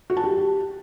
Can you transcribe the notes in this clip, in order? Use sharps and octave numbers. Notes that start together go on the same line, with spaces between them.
F#4
A5
G4